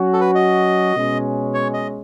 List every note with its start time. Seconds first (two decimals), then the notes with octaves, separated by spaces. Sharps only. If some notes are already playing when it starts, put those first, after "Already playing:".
Already playing: F#3 C#4 F#4
0.13 A4
0.21 B4
0.35 D#5
0.95 B2 G#3 C#4
1.54 C#5
1.74 D#5